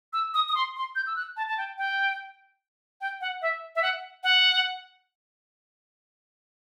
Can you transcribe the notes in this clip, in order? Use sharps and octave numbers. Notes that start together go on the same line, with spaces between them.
E6
D#6
D#6
C6
C6
G6
E6
F#6
A5
A5
G5
G5
G5
F#5
E5
E5
F#5
F#5